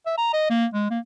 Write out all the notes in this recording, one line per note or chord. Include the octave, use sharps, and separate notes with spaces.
E5
A#5
D#5
A#3
G#3
A#3